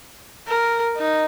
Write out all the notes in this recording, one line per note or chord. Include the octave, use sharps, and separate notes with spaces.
A#4
D#4